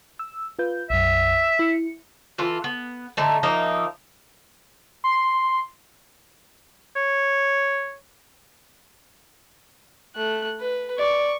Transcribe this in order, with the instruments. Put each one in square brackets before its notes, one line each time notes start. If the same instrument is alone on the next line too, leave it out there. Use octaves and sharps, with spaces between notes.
[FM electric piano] E6
F4 B4 G6
[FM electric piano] B1 F#2 [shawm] E5
[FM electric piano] E4 C#7
[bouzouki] E3 F4 A4
B3
D3 A3 D#4
F3 A#3 D#4 E5
[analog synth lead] C6
[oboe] C#5
[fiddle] A3 F#6
B4
[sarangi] D5 [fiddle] C#6